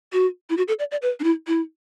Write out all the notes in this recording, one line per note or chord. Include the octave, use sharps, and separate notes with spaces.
F#4
E4
F#4
A4
D5
D5
B4
D4
E4
E4